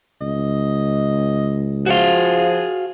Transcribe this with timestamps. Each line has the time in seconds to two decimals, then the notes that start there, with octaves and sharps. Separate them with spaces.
0.21 C#2 D#5
1.86 F3 F#4 G#4 F5